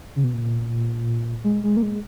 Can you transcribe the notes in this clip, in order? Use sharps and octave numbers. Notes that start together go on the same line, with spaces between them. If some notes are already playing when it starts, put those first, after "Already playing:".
C#3
B2
A#2
G#3
G#3
A#3
G#3